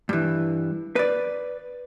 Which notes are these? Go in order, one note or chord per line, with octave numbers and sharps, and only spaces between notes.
G2 E3
B4 D5